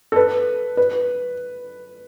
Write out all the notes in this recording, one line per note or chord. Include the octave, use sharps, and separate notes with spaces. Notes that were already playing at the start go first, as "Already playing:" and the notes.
A4
B4
B4